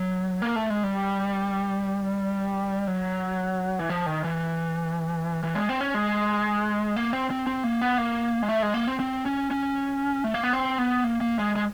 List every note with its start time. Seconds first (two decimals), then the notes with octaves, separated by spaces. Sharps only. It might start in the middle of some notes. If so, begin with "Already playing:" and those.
Already playing: F#3
0.42 A#3
0.56 A3
0.70 G#3
0.83 G3
2.87 F#3
3.79 E3
3.90 F3
4.06 D#3
4.24 E3
5.43 E3
5.55 G#3
5.69 C4
5.81 C#4
5.94 G#3
6.96 A#3
7.13 C4
7.30 C4
7.47 C4
7.64 A#3
7.81 B3
7.98 A#3
8.43 G#3
8.49 A3
8.63 G#3
8.74 A#3
8.88 C4
9.00 C4
9.26 C#4
9.51 C#4
10.24 A3
10.34 A#3
10.43 B3
10.53 C4
10.78 B3
11.04 A#3
11.21 A#3
11.39 G#3
11.56 G#3